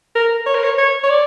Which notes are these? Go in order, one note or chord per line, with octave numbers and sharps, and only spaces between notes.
A#4
C#5
A#4
C#5
C#5
C#5
D5